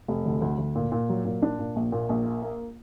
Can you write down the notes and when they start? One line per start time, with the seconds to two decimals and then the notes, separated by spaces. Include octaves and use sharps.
0.08 F1
0.25 D2
0.42 D2
0.58 D2
0.75 A#2
0.92 A#2
1.09 F#3
1.25 A#2
1.42 D4
1.59 A#2
1.76 A#1
1.92 A#2
2.09 A#1
2.25 A#3
2.42 A#3